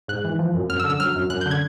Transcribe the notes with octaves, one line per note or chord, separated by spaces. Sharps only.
G#2 F#6
E3
F3
F#2
F#2 F6
E6
D3
E6
F#3 F6
F#2
F#2 F#6
D3 G6
G#6